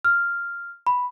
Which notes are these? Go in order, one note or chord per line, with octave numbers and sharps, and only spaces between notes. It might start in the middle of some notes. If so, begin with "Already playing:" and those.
F6
B5